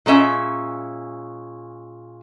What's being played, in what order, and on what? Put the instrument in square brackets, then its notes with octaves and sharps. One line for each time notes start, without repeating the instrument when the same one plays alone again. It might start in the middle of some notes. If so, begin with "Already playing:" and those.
[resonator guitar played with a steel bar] A#2 G#3 C#4 E5